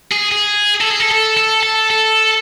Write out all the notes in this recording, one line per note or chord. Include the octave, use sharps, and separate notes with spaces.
G#4
G#4
A4
G#4
A4
A4
A4
A4
A4